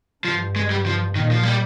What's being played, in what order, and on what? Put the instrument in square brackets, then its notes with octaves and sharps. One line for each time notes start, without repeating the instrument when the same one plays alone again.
[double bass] G2 [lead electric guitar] F3
[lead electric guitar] G#3
G3
F3
[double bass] A#2 [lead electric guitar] D#3
[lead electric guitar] F3
G3